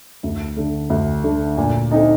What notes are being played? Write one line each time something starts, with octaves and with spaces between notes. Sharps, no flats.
D2
D3 A3
D2
D3 A3
A#2
A3 C4 D#4